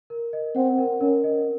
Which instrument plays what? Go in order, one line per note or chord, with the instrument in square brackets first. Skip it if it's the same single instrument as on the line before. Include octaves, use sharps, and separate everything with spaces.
[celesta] A#4
D#5
[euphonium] C4 [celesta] F#5
[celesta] A#4
[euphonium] C#4 [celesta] A#4
[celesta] D#5